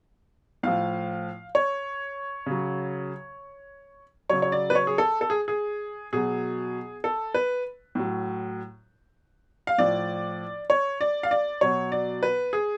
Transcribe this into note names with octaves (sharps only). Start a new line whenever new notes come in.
A2 F3 F5
C#5
C#3 F#3
C#3 F#3 C#5
C#5
D5
B4
C#5
G#4
A4
A4
G#4
G#4
B2 F#3 G#4
A4
B4
A2 F#3
F5
A2 F3 D5
C#5
D5
F5
D5
B2 F#3 C#5
D5
B4
G#4